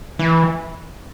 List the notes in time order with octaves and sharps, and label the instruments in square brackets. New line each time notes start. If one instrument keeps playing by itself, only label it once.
[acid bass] E3